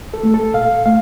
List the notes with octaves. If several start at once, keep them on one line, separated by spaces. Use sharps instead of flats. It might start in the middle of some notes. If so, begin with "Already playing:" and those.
A4
A3
A4
A#2 F5
A3 F5